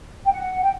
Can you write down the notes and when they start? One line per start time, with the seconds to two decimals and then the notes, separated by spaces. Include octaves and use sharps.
0.26 G5
0.32 F#5
0.62 G5